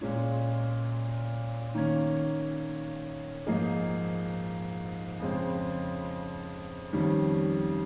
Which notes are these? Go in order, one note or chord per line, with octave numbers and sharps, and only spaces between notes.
A#2 G#3 C#4 F4
D#3 A#3 C#4
G#2 F3 A#3 D#4 G#4
F2 C#3 G#3 C4
F2 D#3 G3 C#4